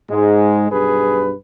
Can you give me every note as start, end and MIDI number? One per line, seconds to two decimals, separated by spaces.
0.10 0.69 44
0.10 0.69 56
0.71 1.33 35
0.71 1.33 43
0.71 1.33 68
0.71 1.33 71